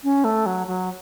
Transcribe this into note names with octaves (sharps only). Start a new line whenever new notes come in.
C#4
A3
F#3
F#3